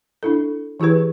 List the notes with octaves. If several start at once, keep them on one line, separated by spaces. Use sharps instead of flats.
D4 E4 A4
E3 E4 G4 G#4 B4